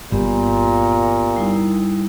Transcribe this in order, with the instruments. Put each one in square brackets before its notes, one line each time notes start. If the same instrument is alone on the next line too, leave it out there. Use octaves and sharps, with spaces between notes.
[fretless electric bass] G1 [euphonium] A#2 [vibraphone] B3 G4
[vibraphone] G3 D#4 E4